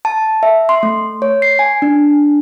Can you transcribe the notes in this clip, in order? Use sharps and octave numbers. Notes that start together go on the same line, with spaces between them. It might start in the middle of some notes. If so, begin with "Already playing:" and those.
A5
E5
C6
A3
C#5
C7
G#5
D4